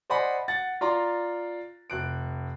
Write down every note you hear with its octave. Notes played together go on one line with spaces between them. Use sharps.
C5 D5 D#5 F#5 G#5 B5
F#5 A6
F4 D5 A#5 C6
F1 F#6 D7